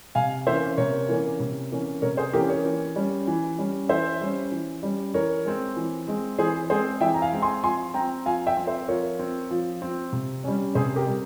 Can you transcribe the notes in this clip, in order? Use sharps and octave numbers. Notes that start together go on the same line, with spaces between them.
C3 F5 G#5
E3 A#3 C#4 C5 E5
C3 A#4 C#5
E3 A#3 C#4
C3
E3 A#3 C#4
C3 A#4 C#5
G#4 C5
E3 A#3 C#4 G4 A#4
A#4 C#5
E3
G3 C#4
E3
G3 C#4
E3 C5 E5
G3 C#4
E3
G3 C#4
E3 A#4 C#5
G#3 C4
E3
G#3 C4
E3 G#4 C5
G#3 C4 G#4 C5
E3 E5 G5
A#5
F5 G#5
G#3 C4
G#5 C6
F3 G#5 C6
C4 G5 A#5
F3 F5 G#5
E5 G5
C4
C5 E5
F3 A#4 C#5
C4
F3
C4
C3
G3 C#4
C3 G#4 C5
G4 A#4
G3